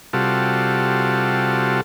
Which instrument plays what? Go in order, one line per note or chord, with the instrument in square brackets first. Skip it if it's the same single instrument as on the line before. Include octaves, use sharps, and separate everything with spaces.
[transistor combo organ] C3 G3 F4 F#4 A4